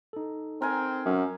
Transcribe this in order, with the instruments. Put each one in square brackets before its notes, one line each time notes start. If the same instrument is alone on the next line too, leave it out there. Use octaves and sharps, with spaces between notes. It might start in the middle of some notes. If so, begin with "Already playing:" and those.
[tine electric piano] D#4 A4
[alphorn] C4 [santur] A#4 G#5
[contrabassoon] F#2